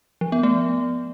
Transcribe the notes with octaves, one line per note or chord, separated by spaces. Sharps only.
F3
B3
A3